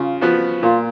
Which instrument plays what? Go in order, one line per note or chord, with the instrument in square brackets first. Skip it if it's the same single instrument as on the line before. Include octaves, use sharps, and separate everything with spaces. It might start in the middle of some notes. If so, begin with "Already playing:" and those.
Already playing: [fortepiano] C#3 [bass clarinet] F4
[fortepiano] F3 B3 F#4
[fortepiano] A#2 [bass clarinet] F4